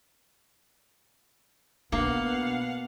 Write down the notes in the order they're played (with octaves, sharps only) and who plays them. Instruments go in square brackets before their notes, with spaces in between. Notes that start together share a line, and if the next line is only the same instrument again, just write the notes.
[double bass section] B2 B3 [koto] A#3 [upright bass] D4 [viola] F5 F#5